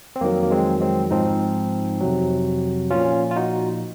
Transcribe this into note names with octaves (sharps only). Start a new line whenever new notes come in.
C4
F2 D#3 F#3 A#3
A#3
G#3 C4
G#3 C4
G#2 F3 C4 D#4
F2 C3 F#3
A#2 F3 C#4 F4
F4
D#4 F#4